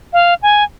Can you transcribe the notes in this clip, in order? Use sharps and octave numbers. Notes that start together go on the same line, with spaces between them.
F5
G#5